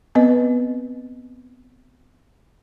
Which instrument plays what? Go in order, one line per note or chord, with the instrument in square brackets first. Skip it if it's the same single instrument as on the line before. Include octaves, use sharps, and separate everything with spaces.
[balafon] B3 C4 B4 D#5